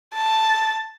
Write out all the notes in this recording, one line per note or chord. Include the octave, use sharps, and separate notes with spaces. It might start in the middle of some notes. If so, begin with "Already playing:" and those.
A5